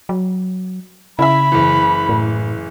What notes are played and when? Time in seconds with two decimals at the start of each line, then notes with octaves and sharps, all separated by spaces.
0.09 F#3
1.19 C#3 E4 E5 B5
1.52 F#1 E3
2.09 A2